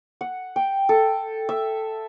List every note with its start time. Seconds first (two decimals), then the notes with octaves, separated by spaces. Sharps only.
0.21 F#5
0.56 G5
0.89 A4
1.49 E5